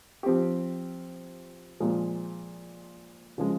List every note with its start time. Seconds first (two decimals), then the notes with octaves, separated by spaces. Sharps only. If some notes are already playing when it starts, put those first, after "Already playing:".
0.23 F3 C4 G4
1.80 A#2 F3 G#3
3.38 C#3 F3 G#3